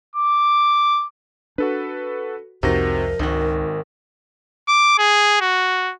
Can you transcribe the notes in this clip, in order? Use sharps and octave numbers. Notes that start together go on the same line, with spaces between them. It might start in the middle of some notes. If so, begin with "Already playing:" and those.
D6
D4 F#4 A4 B4
C2 F2 C3 F3 D#4 F#4 A#4 A#6
G#1 C#2 D#3 F#4
D6
G#4
F#4